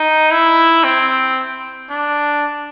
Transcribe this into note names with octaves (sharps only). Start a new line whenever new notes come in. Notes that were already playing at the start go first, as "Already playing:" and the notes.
Already playing: D#4
E4
C4
D4